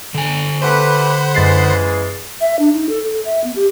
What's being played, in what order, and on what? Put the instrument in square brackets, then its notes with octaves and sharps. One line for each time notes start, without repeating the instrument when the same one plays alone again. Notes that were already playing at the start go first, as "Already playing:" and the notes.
[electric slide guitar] D3 G#5
[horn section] A3 G4 B4 [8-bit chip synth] C5 F#5 B5
[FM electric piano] F#2 A6 C7 [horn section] C#3 E3 G#3
[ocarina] E5
D4
D#4
A4
A4
E5
B3
G4